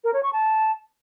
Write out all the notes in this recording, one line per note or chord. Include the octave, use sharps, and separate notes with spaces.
A#4
C#5
C#6
A5